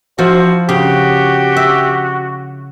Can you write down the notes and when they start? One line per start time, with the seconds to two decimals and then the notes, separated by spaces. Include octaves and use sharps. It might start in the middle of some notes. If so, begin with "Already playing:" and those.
0.19 F3 E4 F#4 C5
0.69 C#3 F#4 G4
1.56 E5